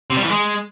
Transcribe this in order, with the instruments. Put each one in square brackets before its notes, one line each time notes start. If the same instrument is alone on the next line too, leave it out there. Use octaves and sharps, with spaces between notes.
[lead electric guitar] C3
G3
E3
G#3